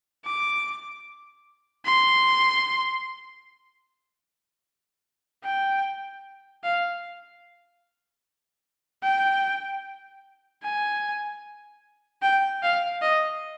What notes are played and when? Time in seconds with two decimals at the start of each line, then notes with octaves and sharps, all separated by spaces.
0.25 D6
1.85 C6
5.44 G5
6.64 F5
9.03 G5
10.63 G#5
12.22 G5
12.63 F5
13.02 D#5